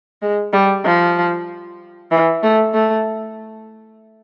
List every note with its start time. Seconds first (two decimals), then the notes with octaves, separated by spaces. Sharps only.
0.22 G#3
0.53 G3
0.85 F3
2.11 E3
2.43 A3
2.74 A3